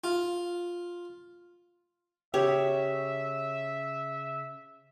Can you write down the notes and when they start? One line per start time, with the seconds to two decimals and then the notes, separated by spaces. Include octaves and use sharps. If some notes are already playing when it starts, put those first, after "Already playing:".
0.04 F4
2.34 C#3 G4 C#5 E5